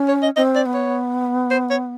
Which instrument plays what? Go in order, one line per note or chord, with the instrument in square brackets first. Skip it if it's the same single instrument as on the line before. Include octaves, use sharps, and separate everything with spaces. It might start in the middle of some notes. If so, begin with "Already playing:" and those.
Already playing: [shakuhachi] C#4
[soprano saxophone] C#5
D#5
[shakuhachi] C4 [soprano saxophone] D#5
[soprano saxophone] D5
[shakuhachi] B3
[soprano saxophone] C#5
C5
C#5